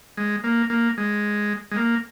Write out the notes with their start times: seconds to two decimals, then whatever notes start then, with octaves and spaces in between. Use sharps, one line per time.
0.17 G#3
0.44 A#3
0.70 A#3
0.98 G#3
1.71 G#3
1.77 A#3